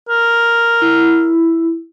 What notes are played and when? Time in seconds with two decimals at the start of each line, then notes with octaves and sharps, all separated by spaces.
0.09 A#4
0.82 E4